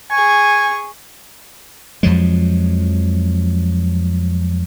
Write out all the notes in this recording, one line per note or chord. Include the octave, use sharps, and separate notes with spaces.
G#4 G#5 C#6
F2 F3 F#3 G#3